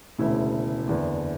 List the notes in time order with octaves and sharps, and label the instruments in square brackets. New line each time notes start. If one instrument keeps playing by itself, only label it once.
[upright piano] E1 D2 C#3 E4
F#1 E2 D3 D4